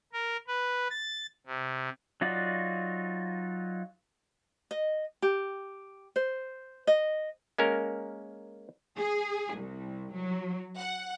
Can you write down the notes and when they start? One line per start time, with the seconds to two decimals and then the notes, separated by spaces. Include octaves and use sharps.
0.13 A#4
0.47 B4
0.90 A6
1.46 C3
2.21 F#3 D#4 F4 F#4 D5
4.71 D#5
5.22 G4
6.16 C5
6.87 D#5
7.58 G#3 A#3 C#4 A#4
8.97 G#4
9.56 C2
10.15 F#3
10.77 F#5